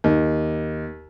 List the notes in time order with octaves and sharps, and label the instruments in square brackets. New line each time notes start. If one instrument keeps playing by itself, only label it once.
[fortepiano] D#2